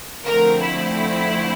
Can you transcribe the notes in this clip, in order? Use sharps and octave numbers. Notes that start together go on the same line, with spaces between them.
D3 F3 A3 C4 A#4
E4